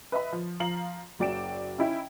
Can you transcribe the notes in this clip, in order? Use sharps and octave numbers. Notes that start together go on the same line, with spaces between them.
B4 D#5 E5 B5
F3
F3 F5 A#5 C7 F#7
F#1 F#3 D5 G5 D7 E7
C#4 D#4 E4 E5 G5